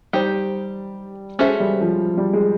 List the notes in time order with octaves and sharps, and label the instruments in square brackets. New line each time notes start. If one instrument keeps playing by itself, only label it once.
[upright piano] G3 [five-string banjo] D#4 G4 C5
[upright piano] G#3 [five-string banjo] C#4 F#4 A4 C5 E5
[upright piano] G3
F3
G3
G#3